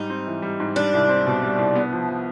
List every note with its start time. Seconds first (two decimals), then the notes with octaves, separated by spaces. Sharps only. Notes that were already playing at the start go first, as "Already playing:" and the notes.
Already playing: G#2 G3 D#4
0.10 C4
0.27 E3
0.42 G3
0.60 G#2
0.76 G3 D4
0.93 C2
1.09 C4
1.27 B2
1.42 G3
1.59 C2
1.75 B3
1.93 F3
2.08 F3